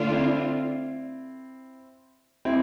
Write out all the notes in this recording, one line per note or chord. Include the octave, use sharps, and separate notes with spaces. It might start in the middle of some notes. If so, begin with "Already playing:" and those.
Already playing: D3 A3 D4 F4
C4 E4
C4 E4